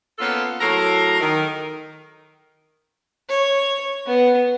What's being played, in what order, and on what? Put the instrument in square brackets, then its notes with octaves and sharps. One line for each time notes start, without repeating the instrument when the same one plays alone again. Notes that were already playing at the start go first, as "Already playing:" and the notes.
[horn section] A#3 B3 C#4 F4 A4
A2 F#3 A4 A#4 A#5 C6
D#3
[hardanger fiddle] C#5
B3